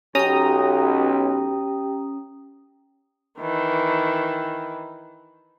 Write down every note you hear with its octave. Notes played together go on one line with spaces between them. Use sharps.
B1 C#4 G4 G5 A#5 D#6
D#3 E3